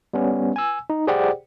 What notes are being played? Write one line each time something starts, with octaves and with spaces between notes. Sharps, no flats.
G3 B3 C#4
G#5 E6
D#4
G4 G#4 C5 D5 F#5 G5